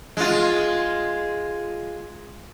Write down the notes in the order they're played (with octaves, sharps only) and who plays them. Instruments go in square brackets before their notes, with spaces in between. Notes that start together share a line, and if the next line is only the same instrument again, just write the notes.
[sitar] G#3 F4